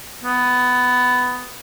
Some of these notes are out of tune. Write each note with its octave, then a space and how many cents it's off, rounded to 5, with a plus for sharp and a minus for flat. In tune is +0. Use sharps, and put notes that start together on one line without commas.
B3 +10